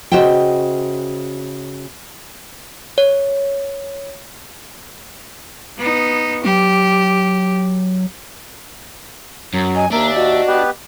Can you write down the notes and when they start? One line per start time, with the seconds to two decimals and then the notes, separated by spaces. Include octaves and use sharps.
0.12 C#3 F#4 C5 D#5 E5 G5
2.98 C#5
5.78 B3 D#4
6.45 F#3 G4
9.54 F#2 F#3
9.75 D#5 G#5
9.92 D#2 A#3 D4 E5 A#5
10.15 F#4 D#5
10.47 B3 G4 B4